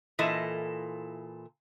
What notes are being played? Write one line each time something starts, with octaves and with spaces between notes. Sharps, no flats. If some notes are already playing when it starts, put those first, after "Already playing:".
A#2 E3 E4 A4 D#5